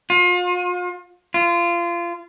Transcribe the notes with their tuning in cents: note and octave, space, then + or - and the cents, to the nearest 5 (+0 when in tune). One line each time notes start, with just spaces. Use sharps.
F4 +35
F4 -25